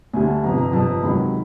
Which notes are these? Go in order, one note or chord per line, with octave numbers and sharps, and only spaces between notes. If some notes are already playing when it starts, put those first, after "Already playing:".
D2 D3 G3 G#5
A5
G1 F2 C3 A#5
A#5
G1 F2 C3 A5
A#5
C#2 C3 D#3 F#3 B5